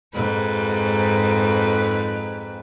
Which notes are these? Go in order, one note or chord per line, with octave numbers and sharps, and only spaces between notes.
F2 G#2 B4